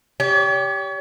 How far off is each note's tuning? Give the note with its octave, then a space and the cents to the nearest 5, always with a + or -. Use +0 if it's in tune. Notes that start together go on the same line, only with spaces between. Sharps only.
G4 +0 C#5 +40